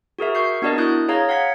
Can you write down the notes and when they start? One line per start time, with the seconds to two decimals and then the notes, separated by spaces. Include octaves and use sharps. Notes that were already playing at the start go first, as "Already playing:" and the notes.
0.19 F#4 G#4 A#4 E5
0.35 C#6 G6 C7
0.62 B3 D4 F#4 A#4 D5 D#5
0.78 E4 D#6 F#6 G6
1.08 G#4 C#5 F5 A#5 G#6
1.29 F5 F#5 G#6 B6